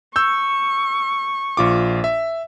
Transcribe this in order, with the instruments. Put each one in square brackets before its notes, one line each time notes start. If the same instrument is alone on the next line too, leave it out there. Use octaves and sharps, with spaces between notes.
[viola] C#6 [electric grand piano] E6 G6
[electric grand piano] A#1 F4 D6
E5